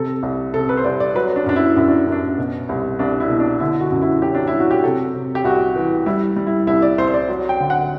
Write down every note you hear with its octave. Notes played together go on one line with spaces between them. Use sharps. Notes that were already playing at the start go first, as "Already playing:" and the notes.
Already playing: C3 A4
C2
C3 A4
B4
C5
C2 D5
D5
F#3 B4
D4
F#2 D4
E4
F#2 E4
D4
F#2
D4
B2
C2
C2 D4
E4
B2
D4
D3 E4
F#4
F#2
E4
F#3 G4
D4
E4
F#3
F#4
G4
C3 A4
C3
G4
C2 F#4
E3
G3 E4
G3
E4
C2 E4
D5
C2 C5
C5
D5
F#3
G5
D3
F#5